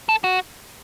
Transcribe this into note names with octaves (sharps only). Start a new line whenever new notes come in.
A4
F#4